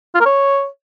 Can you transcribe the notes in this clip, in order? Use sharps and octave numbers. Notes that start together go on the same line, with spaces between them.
F4
A#4
C#5